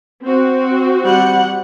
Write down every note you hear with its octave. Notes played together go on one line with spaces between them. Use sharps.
C4 F#4
G3 F#5